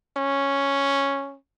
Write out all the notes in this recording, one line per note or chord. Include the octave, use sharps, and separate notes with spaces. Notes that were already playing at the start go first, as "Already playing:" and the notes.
C#4